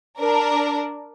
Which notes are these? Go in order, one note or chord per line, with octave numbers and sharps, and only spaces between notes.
D4 A#4